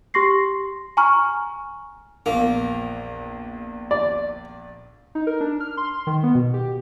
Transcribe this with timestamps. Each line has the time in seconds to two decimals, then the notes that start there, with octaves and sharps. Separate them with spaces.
0.14 G4 C6 C#6 A#6 C7
0.97 G#5 A#5 C#6 F6
2.26 A#1 E2 A#3
3.91 D5
5.15 D#4
5.27 A#4
5.41 D4
5.60 F6
5.77 C6
6.07 D#3
6.23 B3
6.35 B2
6.54 G4